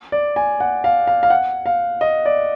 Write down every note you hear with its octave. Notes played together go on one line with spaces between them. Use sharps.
D5
G#5
F#5
F5
F5
F5
F#5
F5
D#5
D5